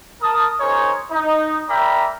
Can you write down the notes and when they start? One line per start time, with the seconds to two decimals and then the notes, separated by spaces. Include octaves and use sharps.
0.21 A#4 A5 D#6
0.60 D#4 G#4 A#4 C5 C#5
1.11 D#4
1.69 A#4 D5 E5 G5 A#5 B5